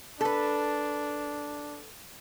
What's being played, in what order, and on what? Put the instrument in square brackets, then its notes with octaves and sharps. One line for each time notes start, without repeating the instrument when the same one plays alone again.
[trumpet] D4 [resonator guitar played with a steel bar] A4 B4